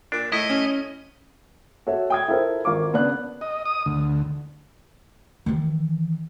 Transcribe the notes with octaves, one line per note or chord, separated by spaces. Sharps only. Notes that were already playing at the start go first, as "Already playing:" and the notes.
A#2 D4
A2 E4 D#5
C#4
F#4 A4 C#5 E5
G5 D#6 G#6
E4 F4 A4 A#4 C5
G#1 F4 A#4 C#6 D6
C#3 B3 D4 F#6
D#5
D#6
D2
D#3 E3